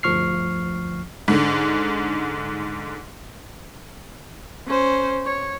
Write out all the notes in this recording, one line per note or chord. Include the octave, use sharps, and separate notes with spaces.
G1 D2 F3 C#6 F6 C7
G#2 D3
C#4 C5
C#5